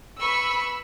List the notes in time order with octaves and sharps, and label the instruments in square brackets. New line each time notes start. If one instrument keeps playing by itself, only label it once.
[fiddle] B4 C#6 [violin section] B5 E6